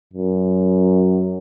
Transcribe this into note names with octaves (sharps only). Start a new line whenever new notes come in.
F#2